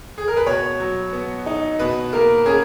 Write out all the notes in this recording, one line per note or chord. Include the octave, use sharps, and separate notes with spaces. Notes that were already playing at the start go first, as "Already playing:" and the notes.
G#4
A#4
B4
B2 C#5
F#3
B3
D#4
B2 B4
A#3 A#4
C#4 G#4